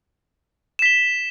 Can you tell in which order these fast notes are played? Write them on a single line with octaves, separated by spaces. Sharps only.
E7 B6 G7